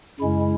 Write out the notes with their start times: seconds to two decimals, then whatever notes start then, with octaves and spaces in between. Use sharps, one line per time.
0.20 F#2 C#3 G#3 C#4 E4